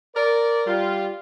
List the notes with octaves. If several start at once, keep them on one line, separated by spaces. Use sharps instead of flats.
A#4 D5
G3 F4